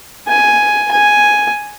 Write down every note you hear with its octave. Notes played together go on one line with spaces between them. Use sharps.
G#5
G#5